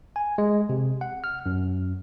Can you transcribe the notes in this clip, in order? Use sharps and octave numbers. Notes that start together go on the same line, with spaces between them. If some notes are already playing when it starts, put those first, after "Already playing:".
G#5
G#3
C3
F#5
F6
F#2